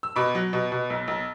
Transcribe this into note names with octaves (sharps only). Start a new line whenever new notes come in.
E6
B2 B5 D6
F#3
B2
B2
B1
B1